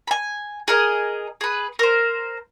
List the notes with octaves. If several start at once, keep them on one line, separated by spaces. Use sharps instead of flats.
G#5 B5
G#4 A#4 D#5
G#4 B4
A#4 C5